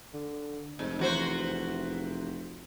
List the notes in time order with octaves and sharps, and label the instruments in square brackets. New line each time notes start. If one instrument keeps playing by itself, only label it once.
[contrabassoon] D3
[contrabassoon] F1 [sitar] G#2
[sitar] E2 F#4 C5